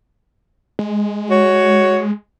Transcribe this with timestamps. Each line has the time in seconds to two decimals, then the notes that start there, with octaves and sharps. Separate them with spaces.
0.79 G#3
1.31 F#4 C#5